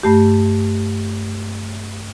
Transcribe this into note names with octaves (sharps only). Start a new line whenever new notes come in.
G2 A3 G4